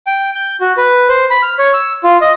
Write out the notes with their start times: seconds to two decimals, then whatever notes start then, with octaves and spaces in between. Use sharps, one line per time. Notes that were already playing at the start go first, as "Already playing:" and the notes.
0.07 G5
0.35 G6
0.60 F#4
0.77 B4
1.09 C5
1.31 B5
1.43 F6
1.59 C#5
1.74 E6
2.04 F4
2.21 D#5